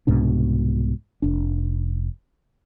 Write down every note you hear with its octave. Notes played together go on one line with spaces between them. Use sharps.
C2 G#2 B2 D4
F1 D4